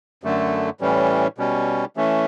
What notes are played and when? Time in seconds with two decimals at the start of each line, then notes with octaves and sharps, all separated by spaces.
0.24 F#2 D3 A3
0.81 A2 E3 G3 C#4
1.38 B2 G3 C#4
1.97 E3 A3 C#4